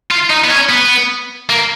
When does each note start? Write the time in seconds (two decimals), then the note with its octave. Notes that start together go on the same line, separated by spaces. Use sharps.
0.11 F4
0.30 D#4
0.44 B3
0.50 C#4
0.69 B3
1.50 A#3